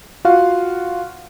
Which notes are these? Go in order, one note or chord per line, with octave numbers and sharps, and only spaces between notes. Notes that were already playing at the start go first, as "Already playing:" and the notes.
F4 F#4 F5 F#5